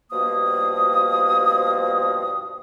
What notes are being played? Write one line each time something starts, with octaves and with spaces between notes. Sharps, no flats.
G2 B2 F3 A#3 D#6